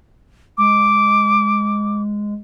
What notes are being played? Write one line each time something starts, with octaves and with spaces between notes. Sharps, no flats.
G#3 D6